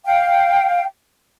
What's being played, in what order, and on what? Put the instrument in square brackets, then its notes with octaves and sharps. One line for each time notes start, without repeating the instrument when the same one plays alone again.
[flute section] F5 G5